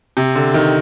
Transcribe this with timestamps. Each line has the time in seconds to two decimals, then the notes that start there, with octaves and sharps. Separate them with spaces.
0.17 C3
0.36 D3
0.54 D#3